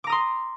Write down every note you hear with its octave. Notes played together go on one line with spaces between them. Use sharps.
A#5 C6 D6 D#6